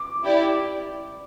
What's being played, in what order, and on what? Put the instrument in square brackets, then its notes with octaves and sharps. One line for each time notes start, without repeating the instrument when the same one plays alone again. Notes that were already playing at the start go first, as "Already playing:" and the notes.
Already playing: [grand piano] D6
[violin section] E4 G4 D5